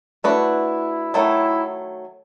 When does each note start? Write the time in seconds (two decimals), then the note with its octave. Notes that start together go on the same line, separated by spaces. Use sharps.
0.24 A3 D4 E4 F#4 B4
1.14 D#3 F#3 A3 E4